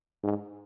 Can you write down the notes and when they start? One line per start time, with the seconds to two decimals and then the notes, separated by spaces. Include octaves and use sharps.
0.24 G#2